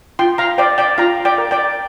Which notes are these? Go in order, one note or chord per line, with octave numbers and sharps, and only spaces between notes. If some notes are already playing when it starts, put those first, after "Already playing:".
F4 G5 C6
F5 A#5
C5 D5 G5
D5 G5
F4 F5 A#5
D5 G5
A#4
D5 G5